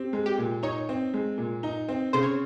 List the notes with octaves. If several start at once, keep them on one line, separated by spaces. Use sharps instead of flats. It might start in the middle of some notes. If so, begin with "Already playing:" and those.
Already playing: C4 G4
G#3
G4
A#2
D#4 C#5
C4
G#3
A#2
D#4
C4
C#3 C5
C#5